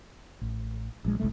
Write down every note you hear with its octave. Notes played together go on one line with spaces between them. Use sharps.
A1
A#1 G#3
F#1 C2 G#3 A3